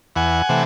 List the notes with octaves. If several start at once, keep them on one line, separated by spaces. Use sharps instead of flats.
E2 F#5 G#5
C3 E3 A3